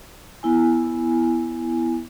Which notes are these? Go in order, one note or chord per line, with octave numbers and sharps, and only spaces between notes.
B3 E4 G#5